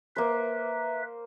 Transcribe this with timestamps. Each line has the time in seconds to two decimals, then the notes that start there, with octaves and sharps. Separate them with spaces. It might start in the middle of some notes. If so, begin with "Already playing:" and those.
0.16 A#3 B4 C5 E5